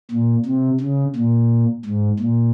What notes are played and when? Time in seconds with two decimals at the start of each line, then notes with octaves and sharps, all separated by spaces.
0.11 A#2
0.45 C3
0.81 C#3
1.16 A#2
1.85 G#2
2.20 A#2